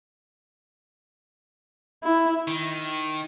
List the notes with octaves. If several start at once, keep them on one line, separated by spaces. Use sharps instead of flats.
E4
D#3